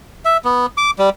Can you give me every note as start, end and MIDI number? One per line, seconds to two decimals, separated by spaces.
0.25 0.37 76
0.45 0.66 59
0.77 0.91 86
0.99 1.10 55